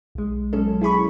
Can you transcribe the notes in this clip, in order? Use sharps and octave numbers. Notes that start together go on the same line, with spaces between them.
B1 G#3
B2 F#3 G#3 C#4 A4
E4 G#4 B5 C#6